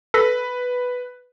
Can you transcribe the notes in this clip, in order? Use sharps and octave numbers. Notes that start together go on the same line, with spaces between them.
A4 B4 A#6 B6